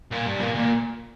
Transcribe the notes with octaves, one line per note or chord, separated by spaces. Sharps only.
A#2
G2
A#2
A#2